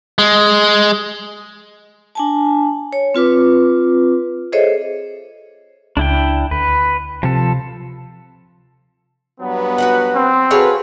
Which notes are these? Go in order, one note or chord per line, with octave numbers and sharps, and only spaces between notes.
G#3
D4 G#5 A5
C#5
C4 F4 B4 D6
G#4 A4 C5 C#5 D#5 E5
C#2 D4 E4 G5
D2 B4
C3 F3 A4
G2 F#3 B3
F#4 B4 F#5
C4
F#4 G#4 A4 B4 C#5 F5